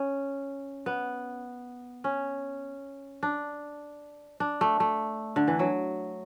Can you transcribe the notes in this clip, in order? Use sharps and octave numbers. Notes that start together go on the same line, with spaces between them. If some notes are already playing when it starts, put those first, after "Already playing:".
Already playing: C#4
B3
C#4
D4
D4
A3
A3
D3
E3
F#3